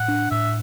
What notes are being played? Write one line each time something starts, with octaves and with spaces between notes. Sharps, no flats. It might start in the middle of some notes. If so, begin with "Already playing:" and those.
Already playing: A2 F#5
D4
A2 E5